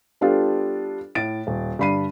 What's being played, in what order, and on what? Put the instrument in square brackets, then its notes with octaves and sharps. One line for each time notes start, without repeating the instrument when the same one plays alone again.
[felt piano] G3 B3 D4 F4 G4 A4
A2 A6 D7
D#1
G2 D3 B5 C7 D#7